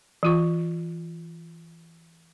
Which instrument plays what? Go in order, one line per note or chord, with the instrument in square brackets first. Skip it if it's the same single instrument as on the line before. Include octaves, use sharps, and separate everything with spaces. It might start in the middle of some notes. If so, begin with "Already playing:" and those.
[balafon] E3 F4 C#6